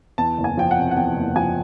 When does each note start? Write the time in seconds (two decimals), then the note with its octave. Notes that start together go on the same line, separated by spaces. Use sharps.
0.18 E2 A5
0.38 F#1
0.44 G#5
0.57 F3 G5
0.71 F#5
0.77 C3
0.91 F#5
0.97 E2 G5
1.16 F#1
1.36 F3 G#5